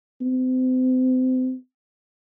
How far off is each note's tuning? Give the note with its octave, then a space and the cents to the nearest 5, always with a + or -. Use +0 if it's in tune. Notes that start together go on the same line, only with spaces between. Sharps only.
C4 -35